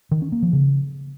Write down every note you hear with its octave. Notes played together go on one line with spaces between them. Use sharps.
D#3
C#4
A#3
F3
C#3